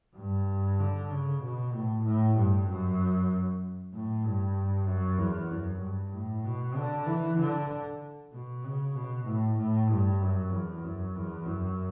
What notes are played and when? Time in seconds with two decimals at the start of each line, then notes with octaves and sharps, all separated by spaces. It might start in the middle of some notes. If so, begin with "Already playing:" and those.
0.16 G2
0.79 D3
1.10 C#3
1.42 B2
1.74 A2
2.05 A2
2.36 G2
2.68 F#2
3.93 A2
4.24 G2
4.87 F#2
5.18 E2
5.51 F#2
5.81 G2
6.12 A2
6.44 B2
6.76 D3
7.06 E3
7.38 D3
8.33 B2
8.64 C#3
8.96 B2
9.26 A2
9.58 A2
9.90 G2
10.21 F#2
10.52 E2
10.84 F#2
11.15 E2
11.46 F#2